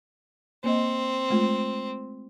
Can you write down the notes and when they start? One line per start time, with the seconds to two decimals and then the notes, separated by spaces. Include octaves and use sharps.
0.64 A#3 C4 D#5
1.30 G#3 A3 F4